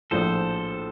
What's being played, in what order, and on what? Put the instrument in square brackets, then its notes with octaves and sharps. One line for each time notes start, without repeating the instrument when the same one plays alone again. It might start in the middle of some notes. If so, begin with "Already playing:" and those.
[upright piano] A#1 A2 F3 [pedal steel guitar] A4 C5